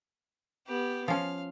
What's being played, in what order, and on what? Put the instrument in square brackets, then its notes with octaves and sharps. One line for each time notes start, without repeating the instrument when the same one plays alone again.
[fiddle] B3 G4
[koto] F3 C#4 [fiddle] F5